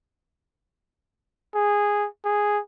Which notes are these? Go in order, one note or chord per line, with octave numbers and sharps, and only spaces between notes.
G#4
G#4